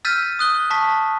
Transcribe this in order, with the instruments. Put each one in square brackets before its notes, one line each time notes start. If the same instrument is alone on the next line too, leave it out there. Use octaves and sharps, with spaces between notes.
[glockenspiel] E6 F6 G6 A6 B6 D#7
D#6 F#6 G7
A5 C#6 B6